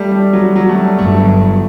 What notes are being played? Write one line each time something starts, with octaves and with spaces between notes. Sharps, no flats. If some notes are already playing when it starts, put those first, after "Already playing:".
Already playing: G3 A3
G3
F#3
F#3
A3
G3
G1 G2 F#3 A3